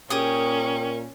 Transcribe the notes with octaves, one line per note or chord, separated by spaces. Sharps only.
A#2 C#4 G4 G#4 A#4 C#6 D#6